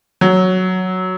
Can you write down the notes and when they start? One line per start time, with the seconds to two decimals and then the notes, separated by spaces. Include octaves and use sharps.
0.21 F#3